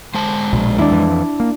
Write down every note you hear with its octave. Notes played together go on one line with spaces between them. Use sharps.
G#3 C5 A5
A#1 B2
D#2 D#3 D4 E4
F2 E3
A#3